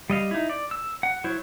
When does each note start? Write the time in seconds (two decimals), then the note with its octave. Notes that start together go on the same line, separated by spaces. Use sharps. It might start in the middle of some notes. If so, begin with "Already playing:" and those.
0.10 G3 D#5 F5
0.31 D#4 E4
0.49 D5
0.71 E6
1.03 F#5
1.24 F#3 E4 C5 C#5